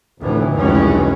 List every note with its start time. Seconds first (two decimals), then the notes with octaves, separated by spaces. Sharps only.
0.21 F1 D2 A2 E3
0.54 F1 C#2 G2 E3 G#3 C#4